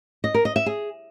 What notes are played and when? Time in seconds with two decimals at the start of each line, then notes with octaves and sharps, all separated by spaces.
0.24 D#5
0.34 A#4
0.45 D#5
0.56 E5
0.66 G#4